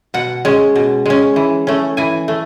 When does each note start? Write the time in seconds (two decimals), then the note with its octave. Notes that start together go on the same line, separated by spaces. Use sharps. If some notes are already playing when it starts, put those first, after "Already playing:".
0.14 B2 F#5
0.45 G#3 C#4
0.76 B2
1.06 G#3 C#4
1.36 E3
1.67 A3 C#4
1.97 E3 G#5
2.28 A3